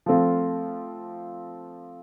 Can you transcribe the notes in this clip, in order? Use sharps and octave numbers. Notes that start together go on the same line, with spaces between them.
F3 A3 C4 F4